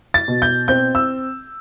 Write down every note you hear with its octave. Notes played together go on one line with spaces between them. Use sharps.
A6
B2
G6
C4 G6
E6